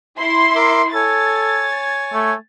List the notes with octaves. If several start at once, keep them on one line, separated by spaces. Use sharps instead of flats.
E4 C6
A#4 E5 D6
A4 C#5 G#5 A6
A3